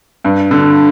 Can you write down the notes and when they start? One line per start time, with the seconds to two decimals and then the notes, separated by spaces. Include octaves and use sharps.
0.25 G2
0.51 D3